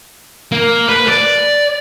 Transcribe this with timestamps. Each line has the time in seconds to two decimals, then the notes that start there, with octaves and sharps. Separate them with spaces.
0.52 A#3
0.89 B4
1.08 D5